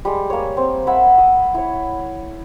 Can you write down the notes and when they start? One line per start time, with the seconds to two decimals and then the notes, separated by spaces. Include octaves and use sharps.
0.05 G3 G#3
0.30 A#3 C#5
0.57 C4
0.87 E5 F#5 G#5 B5
1.18 D#6
1.54 E4 C#5